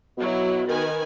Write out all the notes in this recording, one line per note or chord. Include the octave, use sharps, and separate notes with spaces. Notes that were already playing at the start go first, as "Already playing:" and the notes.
B2 F#3 E4
D#3 B4 G#5